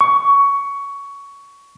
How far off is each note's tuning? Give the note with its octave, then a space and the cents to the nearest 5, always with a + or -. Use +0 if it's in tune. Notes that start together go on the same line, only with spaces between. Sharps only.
C#6 +15